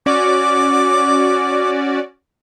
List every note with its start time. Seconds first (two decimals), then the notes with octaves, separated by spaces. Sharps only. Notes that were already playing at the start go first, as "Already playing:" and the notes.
0.06 C#4 F#4 D5 D6